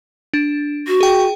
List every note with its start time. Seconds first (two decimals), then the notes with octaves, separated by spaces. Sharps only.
0.34 D4
0.88 F#4
1.01 G#4 G5